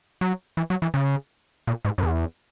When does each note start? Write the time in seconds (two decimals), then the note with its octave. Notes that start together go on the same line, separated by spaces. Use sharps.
0.21 F#3
0.57 E3
0.70 F#3
0.82 E3
0.94 C#3
1.67 A#2
1.85 G#2
1.98 F#2
2.03 E2